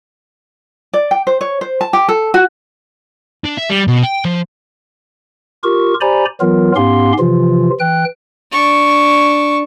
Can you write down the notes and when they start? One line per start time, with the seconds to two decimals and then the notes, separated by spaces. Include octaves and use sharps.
0.93 D5
1.11 G5
1.27 C5
1.41 C#5
1.61 C5
1.81 A5
1.93 G4
2.09 A4
2.34 F#4
3.44 D4
3.57 E5
3.70 G3
3.88 B2
4.03 G5
4.25 F3
5.64 F4 G4 A#4 C#6
6.01 G4 C5 D5 G#5 A#5 B5
6.41 E3 F#3 B3 F4 A#4
6.76 G#2 B3 C#4 G4 F5 C6
7.19 C3 E3 F3 F4
7.80 E3 G5 F#6
8.51 D4 C#6